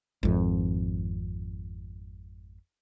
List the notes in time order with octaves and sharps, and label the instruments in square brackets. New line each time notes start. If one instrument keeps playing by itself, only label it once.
[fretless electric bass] G#1 F2